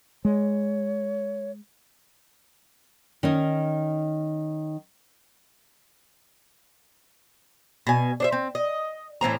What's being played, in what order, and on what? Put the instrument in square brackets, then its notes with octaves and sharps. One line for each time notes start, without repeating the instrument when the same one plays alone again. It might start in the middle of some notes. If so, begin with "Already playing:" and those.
[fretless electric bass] G#3 [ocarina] C#5
[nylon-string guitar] D#3 C#4 D#4
[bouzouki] B2 G#5
D4 C5 E5
C4
D#5
A2 E3 C4 A#5